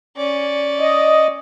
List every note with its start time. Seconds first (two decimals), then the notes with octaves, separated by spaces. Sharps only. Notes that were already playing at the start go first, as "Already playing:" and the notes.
0.17 C#4 D5
0.80 D#5